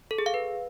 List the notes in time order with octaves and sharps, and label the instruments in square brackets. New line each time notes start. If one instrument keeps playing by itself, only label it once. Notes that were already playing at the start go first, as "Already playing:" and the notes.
[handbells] A4
G#4
F5
B4